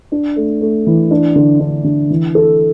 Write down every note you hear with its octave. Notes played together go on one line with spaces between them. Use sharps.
D4
A3
A3
E3
D4
D3
D4
D3
E3
A4